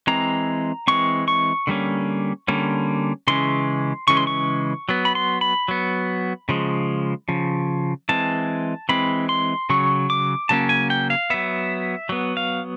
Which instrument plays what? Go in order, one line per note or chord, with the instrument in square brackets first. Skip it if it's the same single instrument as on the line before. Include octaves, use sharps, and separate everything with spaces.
[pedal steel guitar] E3 G#3 C4 A#5
E3 G#3 C4 C#6
C#6
D3 G3 A#3 C#4
D3 G3 A#3 C#4
C#3 E3 G#3 C#4 C6
C#3 E3 G#3 C#4 C#6
C6
C#6
F#3 B3
B5
C6
B5
F#3 B3
C#3 F3 G#3
C#3 F3
E3 G#3 C4 A5
E3 G#3 C4 B5
C6
C#3 F#3 C#6
D6
C#3 F#3 A#3 C#4 A5
G#5
G5
F5
F#3 B3 E5
F#3 B3
F5